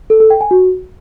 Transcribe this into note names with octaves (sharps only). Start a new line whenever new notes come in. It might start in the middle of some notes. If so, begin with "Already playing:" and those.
A4
A4
G5
G#5
F#4